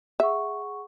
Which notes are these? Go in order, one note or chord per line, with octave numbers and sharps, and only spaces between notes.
G#4 E5 F#5 C#6